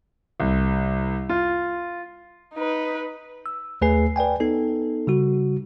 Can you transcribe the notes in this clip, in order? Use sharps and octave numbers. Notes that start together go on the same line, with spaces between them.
C2
F4
D#4 B4
E6
D#2 A3 G#4 B4 G#5 C7
B4 D5 G5 G#5
B3 D#4 A4
C#3 G3 F#4